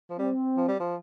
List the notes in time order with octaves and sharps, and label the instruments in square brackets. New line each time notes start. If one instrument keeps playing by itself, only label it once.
[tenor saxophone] F3
[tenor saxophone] G3 [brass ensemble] C4
[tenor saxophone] F3
G3
F3